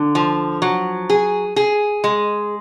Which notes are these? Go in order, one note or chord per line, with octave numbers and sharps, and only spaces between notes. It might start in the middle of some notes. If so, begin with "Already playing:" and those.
Already playing: D3
F3
F#3
G#4
G#4
G#3